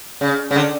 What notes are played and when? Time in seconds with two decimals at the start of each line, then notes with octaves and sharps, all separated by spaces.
0.21 C#3
0.51 C#3
0.56 D3